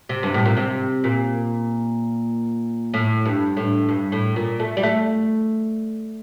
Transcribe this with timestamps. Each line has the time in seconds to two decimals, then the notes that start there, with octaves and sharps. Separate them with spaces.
0.09 C3
0.23 G2
0.34 A2
0.46 A#2
0.57 C3
1.04 A#2
2.94 A2
3.26 G2
3.57 A2
3.89 G2
4.12 A2
4.36 A#2
4.60 A3
4.77 G3
4.83 A3